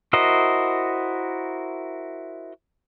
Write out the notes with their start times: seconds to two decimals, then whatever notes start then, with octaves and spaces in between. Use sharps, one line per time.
0.13 E4 F#4 A#4 C5 D#5